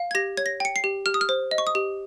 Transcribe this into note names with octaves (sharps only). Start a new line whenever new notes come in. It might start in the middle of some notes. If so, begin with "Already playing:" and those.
Already playing: F5
G#6
G4 A#6
C#5 G#6
A#6
G5 C#7
C7
G4
G4 F6
D#6
F6
C5
D#5
C#6
D#6
G4